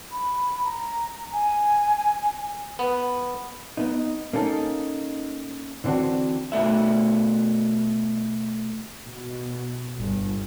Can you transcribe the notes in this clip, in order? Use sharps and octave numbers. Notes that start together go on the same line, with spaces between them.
B5
A#5
G#5
B3
B3 D#4
A#3 C#4 D#4 A4
D3 E3 C4 D4 F#4
B2 A3 F#4 E5
B2
G1